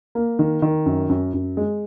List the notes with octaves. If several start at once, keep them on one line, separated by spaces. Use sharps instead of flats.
A#3
D#3
D#3
F#2
F#2
F#2
G#3